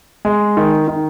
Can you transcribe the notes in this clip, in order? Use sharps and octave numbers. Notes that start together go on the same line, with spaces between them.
G#3
D#3
D#3